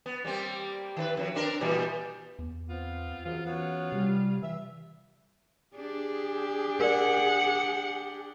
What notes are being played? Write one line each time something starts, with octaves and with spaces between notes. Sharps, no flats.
B3
G3 A#3 C4
D#3 A4 B4
F2 F#3
C4 D4 A#4
A#2 E3 G3
E2
B3 C4 F4
F#2 C#3 E3 F3 F4
B3 C#4 F4 F#4
C3 G3
E3 E5
D4 G4 G#4
A#4 D5 F#5